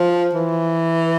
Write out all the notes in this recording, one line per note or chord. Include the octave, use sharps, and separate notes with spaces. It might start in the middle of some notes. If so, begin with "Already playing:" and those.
Already playing: F3
E3